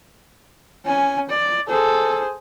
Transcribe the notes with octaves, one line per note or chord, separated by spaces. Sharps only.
C#4 G#5
D5
G#4 A4 C5